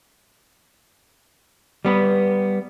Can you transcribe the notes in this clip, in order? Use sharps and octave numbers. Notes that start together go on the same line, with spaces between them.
G3 B3 B4